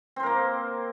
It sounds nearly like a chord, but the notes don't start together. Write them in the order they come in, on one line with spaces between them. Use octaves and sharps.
C4 C5 A#4 A#3